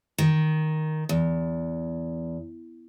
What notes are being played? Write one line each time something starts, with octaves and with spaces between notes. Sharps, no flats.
D#3
E2